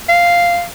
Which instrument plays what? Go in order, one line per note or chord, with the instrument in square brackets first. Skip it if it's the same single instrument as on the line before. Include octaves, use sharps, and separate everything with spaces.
[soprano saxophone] F5